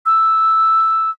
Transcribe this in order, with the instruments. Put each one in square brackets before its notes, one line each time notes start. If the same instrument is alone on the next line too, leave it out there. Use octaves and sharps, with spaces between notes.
[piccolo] E6